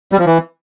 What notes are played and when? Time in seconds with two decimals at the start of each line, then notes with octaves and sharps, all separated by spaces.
0.12 G3
0.19 F3
0.26 E3